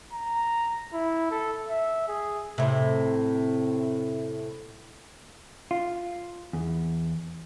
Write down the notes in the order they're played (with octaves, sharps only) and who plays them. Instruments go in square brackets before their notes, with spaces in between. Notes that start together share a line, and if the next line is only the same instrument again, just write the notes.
[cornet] A#5
E4
A4
E5
G#4
[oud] A2 C3
[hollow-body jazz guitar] F4
E2